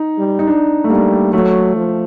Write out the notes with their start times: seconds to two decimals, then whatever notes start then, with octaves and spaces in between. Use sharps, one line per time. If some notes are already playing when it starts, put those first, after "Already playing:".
Already playing: D#4
0.18 G3
0.39 D#4
0.47 D4
0.84 A3
0.90 G3 A#3
1.33 F#3 A3
1.76 F3